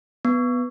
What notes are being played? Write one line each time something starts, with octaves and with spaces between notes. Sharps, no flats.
B3